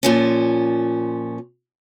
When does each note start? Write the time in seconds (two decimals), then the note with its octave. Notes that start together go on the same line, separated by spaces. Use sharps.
0.03 A#2 F3 C#4